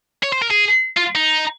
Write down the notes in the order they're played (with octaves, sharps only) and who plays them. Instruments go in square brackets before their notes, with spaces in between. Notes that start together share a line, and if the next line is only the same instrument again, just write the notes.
[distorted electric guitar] C#5
C5
A#4
G#4
F4
D#4